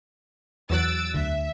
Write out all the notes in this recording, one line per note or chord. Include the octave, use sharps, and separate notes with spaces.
E2 F#3 E6 F#6 A6 D7
D2 D3 E5